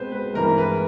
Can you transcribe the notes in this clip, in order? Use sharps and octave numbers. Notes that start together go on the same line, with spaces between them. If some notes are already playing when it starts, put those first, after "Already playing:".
Already playing: B2 G#3 C4 B4 C5
B4
G2 E3 G#3 A#4
B4